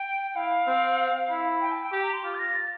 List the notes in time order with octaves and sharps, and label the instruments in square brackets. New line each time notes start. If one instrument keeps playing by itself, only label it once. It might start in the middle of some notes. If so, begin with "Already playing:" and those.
Already playing: [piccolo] G5
G5
[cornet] E4 [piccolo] F5
[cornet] C4
E4
[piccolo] G5
A5
G5
[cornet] G4
[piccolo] A#5
C6
[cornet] F4 [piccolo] D6
[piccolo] A6
A#6
A6